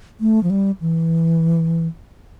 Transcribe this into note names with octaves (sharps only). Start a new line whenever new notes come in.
A3
F3
G3
E3